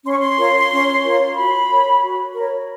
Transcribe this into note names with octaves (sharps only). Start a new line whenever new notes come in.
C#4 C6
C#6
C6
F4 A#4 C#5
C#4
F4 A#4 C#5
F#4 B5
A#4 C#5
F#4
A#4 C#5